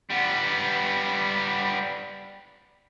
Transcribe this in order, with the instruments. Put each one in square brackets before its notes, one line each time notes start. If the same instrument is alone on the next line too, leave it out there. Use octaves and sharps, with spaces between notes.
[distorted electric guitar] G3 B3